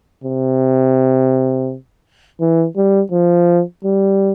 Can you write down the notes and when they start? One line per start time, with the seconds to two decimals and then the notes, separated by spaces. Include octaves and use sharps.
0.24 C3
2.41 E3
2.77 G3
3.12 F3
3.85 G3